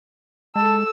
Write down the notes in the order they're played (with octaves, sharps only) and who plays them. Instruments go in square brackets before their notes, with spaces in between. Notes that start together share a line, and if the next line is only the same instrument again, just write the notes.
[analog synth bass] G#3 [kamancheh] A4 E6 [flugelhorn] A5